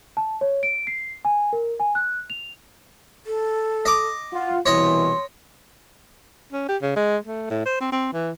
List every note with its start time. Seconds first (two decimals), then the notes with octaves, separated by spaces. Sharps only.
0.17 A5
0.41 C#5
0.63 D7
0.87 C7
1.25 G#5
1.53 A#4
1.80 G#5
1.95 F#6
2.30 F7
3.26 A4
3.86 D#5 D6
4.33 F4 F#5
4.66 C2 B2 E3 C#5 D#5 C6
6.53 C#4
6.68 G4
6.82 C#3
6.96 G#3
7.25 A3
7.50 A2
7.66 C5
7.80 C4
7.92 C4
8.13 E3